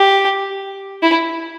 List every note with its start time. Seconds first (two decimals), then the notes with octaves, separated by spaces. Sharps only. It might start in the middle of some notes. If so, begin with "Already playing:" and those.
Already playing: G4
1.02 E4